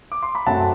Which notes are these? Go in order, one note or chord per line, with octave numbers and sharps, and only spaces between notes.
D6
C6
B5
F#2 F#3 A3 C4 F#5 A5